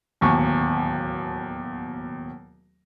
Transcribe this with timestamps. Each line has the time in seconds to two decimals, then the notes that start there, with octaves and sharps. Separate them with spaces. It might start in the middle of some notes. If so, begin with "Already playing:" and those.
0.21 D1 D#2 B2 C#6